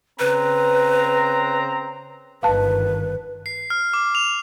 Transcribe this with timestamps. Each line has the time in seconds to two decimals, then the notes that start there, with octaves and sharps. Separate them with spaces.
0.19 C#3 C4 B4 A#5
2.43 G1 G#2 D#3 B4 F5 A5
3.46 C7
3.70 F6
3.94 D6
4.15 F7